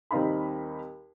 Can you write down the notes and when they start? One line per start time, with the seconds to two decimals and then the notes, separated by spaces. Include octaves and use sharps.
0.11 D#2 G3 C4 D#4 F5 B5